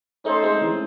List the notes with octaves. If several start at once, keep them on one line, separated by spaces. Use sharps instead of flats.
A3 C#4 D#4 A4 C5
G#3 C4
E3 G#3